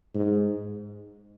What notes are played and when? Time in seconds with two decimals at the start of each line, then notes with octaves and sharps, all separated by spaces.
0.15 G#2